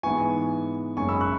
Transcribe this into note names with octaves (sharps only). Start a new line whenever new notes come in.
G#2 E3 B3 E4 G#5 C#6
F#1 F#2 C#3 G#3 C#4 G#5 C#6
B5 E6
C#6 F#6